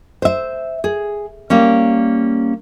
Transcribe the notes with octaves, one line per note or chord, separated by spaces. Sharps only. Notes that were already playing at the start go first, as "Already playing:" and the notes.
C5 E5
G#4
G3 A#3 C#4